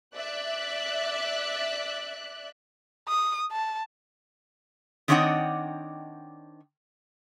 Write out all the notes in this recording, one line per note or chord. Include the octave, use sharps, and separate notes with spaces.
D5 E5 F#6
D#6
A5
D#3 C4 D4 C#5 D#5 F#5